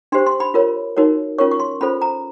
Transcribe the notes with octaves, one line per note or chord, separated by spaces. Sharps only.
D4 G4 C5 C6
C6
B5
F4 A#4 C#5
D#4 F#4 A#4 C#5
C#4 F4 A#4 C#5 C#6
C#6
C6
C#4 F4 A4 C5 B5
A#5